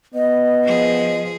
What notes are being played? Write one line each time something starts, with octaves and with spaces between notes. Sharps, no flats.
B3 D#5
F3 G#4